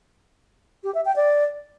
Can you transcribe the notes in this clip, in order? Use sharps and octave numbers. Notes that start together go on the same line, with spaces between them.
G4
E5
G5
D5